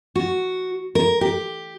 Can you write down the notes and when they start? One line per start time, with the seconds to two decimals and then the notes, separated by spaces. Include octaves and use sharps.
0.15 F#4
0.95 A#4
1.21 G4